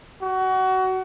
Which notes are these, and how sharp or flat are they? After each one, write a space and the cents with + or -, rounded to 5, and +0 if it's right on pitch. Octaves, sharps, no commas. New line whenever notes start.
F#4 +25